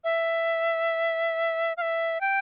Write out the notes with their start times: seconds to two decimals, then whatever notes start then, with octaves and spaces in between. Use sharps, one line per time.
0.04 E5
1.77 F5
1.82 E5
2.21 G5